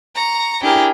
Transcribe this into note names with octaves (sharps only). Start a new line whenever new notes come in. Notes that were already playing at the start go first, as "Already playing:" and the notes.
A#5 C#6
D4 E4 G4 G#4 A#4